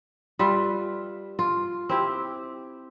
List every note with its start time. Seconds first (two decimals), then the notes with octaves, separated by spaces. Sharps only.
0.39 G3 F4 B4 E5
1.39 F4
1.89 C4 E4 G4